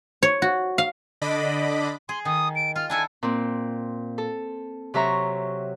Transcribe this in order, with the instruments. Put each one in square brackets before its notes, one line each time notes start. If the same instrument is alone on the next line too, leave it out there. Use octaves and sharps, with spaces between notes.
[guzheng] C#5
F#4
F5
[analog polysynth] D3 D4 D#5 B5 D6
[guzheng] G#4 [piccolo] C6
[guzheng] D#3 [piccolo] D#6
[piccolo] D7
[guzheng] F4 [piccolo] F6
[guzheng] D4 E4 A4 [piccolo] G#5
[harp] A#2 C4
A4
C3 F#3 E5 A#5 C#6